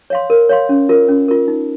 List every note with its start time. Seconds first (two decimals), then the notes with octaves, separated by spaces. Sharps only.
0.10 C#5 F5 C6
0.30 A#4
0.49 C#5 F5 C6
0.69 C#4
0.89 F4 A#4
1.08 C#4
1.28 F4 A#4
1.48 D#4